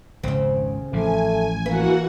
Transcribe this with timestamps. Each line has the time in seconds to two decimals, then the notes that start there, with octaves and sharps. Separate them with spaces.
0.23 G#1 C#2 C#3 C4
0.93 A1 F3 A3 G#5
1.66 E3 A#3 F#4 B4 F#5